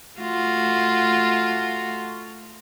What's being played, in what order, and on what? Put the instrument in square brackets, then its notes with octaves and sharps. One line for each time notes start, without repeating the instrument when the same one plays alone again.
[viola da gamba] A3 F4 F#4